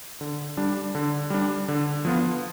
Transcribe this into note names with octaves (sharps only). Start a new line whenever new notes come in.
D3
G3 D4
D3
G3 D4
D3
F3 B3 F4